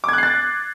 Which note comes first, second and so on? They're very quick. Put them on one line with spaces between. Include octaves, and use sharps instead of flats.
D6 G#6 F#6 C7 A6